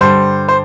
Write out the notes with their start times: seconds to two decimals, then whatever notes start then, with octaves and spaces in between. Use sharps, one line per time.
0.01 G2 D3 G3 C5
0.48 C5